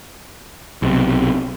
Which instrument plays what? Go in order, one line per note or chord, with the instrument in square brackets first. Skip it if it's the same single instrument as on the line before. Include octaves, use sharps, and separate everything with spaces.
[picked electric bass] B1 C3